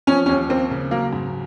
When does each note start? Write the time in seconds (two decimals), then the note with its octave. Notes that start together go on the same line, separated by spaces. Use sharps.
0.07 F3 C#4
0.26 D#2 C#4
0.49 A#3 C4
0.71 C#3
0.91 F#3 A#3
1.13 G#2